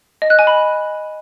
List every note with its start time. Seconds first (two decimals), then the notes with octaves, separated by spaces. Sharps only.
0.22 D#5
0.30 F#6
0.39 G#5
0.47 B5